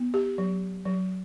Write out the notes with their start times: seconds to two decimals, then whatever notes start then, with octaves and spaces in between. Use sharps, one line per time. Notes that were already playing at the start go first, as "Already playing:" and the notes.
Already playing: B3
0.14 G4
0.38 F#3
0.85 F#3